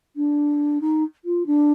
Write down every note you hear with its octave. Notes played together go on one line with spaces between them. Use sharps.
D4
D#4
F4
D4